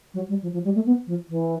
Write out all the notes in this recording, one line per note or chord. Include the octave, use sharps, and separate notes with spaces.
F#3
G3
F3
F3
G3
A3
B3
F3
E3